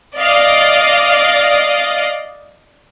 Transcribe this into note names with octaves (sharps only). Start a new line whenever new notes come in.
D5 D#5 F5